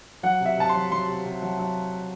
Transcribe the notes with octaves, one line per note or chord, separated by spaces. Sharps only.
F#3 F#5
C3
E5
C3 A5
C6
F#3
F#3 C6
C3
C3
F#3
F#3